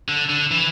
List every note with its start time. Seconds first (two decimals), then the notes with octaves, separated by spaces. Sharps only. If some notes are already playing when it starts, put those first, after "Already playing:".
0.09 D3
0.30 D3
0.51 E3